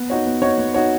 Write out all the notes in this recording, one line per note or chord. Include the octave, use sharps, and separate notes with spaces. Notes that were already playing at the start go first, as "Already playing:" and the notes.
Already playing: B3
D#4 F#4 C#5
B3
D#4 F#4 C#5
B3
D#4 F#4 C#5